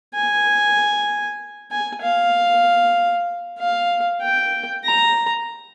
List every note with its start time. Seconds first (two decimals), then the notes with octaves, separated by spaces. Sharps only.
0.15 G#5
1.71 G#5
2.02 F5
3.59 F5
4.22 G5
4.85 A#5